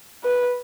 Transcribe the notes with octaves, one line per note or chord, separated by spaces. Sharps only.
B4